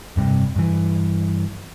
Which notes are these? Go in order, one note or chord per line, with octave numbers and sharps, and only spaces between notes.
F1 G2 C3
G2 E3